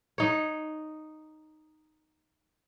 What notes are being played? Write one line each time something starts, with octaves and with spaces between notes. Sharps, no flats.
D#4 C#5